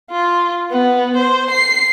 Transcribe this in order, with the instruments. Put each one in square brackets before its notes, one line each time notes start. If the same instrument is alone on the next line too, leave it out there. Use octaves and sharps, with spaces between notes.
[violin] F4
B3
C5
C7